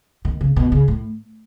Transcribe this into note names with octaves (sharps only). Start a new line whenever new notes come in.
D#3
C#3
B2
C#3
A2